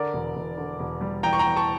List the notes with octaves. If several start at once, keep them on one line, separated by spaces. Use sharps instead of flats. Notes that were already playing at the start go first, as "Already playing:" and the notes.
Already playing: D3 A#4 D5
E1
E1
D3
E1
G3
E2 G5 A#5
C#6
G5 A#5
E2
A5 C#6